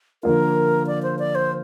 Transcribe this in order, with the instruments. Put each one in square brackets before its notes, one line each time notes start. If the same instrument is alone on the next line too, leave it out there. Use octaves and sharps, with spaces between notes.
[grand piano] D3 F3 A#3 F4 [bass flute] A#4
[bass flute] D5
C5
D5
C5